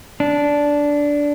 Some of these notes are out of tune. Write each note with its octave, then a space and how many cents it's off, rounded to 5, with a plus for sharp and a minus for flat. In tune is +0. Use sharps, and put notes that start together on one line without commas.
D4 -10